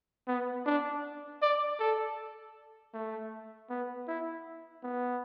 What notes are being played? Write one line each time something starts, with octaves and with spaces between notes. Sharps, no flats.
B3
D4
D5
A4
A3
B3
E4
B3